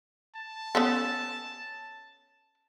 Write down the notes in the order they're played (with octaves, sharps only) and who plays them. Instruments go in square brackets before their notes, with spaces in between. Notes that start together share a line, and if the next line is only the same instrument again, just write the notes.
[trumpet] A5
[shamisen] B3 C#4 A4